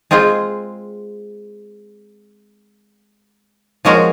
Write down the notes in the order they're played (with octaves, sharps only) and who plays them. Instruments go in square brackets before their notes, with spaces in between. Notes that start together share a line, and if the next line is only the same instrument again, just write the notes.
[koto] G#3 C4 F4 G#4
F3 G#3 C#4 F#4 A#4